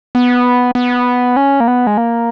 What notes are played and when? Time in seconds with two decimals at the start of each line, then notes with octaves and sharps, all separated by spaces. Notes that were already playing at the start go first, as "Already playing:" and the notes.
0.15 B3
0.75 B3
1.36 C#4
1.60 A#3
1.68 B3
1.87 G#3
1.97 A#3